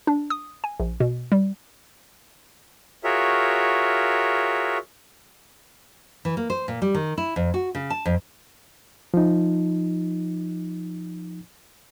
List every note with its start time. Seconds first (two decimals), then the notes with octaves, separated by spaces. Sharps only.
0.07 D4
0.30 D#6
0.64 G#5
0.80 A#1
1.00 B2
1.32 G3
3.04 F4 F#4 G#4 A#4 C#5 E5
6.25 E3
6.37 A#3
6.50 C5
6.68 A#2
6.82 G3
6.95 D#3
7.18 E4
7.36 F2
7.54 F#4
7.75 C#3
7.90 A5
8.05 F2
9.14 F3 D#4